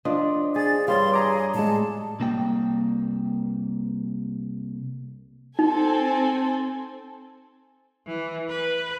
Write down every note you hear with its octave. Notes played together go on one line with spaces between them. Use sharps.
F3 D4 D5 D#5
G#4 A6
G2 G3 C#5 F5 C6
G#4 A#5 D6
A2 G#3 A5
C2 A#3 G5
C4 D#4 A4 G#5
E3
B4